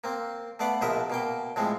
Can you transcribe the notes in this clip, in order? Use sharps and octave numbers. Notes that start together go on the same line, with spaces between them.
A#3 C4
A3 B3 D5 F5 F#5
A#1 B2 F3 A#4 D#5 E5
B2 A#3 G5
A2 F3 G#3 C4